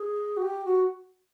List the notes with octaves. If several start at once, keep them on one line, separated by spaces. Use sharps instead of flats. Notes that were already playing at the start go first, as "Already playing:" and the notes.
Already playing: G#4
F#4
G4
F#4